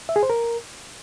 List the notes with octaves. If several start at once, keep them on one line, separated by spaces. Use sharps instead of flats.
E5
G#4
C5
A#4